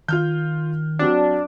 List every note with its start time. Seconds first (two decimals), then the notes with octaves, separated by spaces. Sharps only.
0.08 D#3 F4 F6 G6
0.99 F#3 C4 D4 F#4